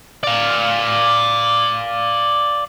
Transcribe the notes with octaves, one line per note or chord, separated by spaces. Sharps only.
D5 F5